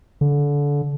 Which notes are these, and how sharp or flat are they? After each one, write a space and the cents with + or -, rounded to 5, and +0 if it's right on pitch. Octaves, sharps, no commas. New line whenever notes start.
D3 -25